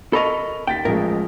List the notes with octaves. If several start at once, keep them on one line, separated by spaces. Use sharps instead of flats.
A4 A#4 D#5 B5 C#6 F7
D#2 G5 A6 B6
A1 F3 G#3 A#4